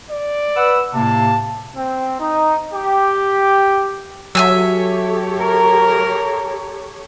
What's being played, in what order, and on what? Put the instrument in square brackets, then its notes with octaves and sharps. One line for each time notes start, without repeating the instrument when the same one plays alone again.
[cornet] D5
[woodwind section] B4 F#5 E6
[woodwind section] A2 C3 A#3 [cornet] A5
[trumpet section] C4
D#4
G4
[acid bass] F#3 [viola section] G4 A4 C#5 [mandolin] E5 G#5 E6
[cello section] A#4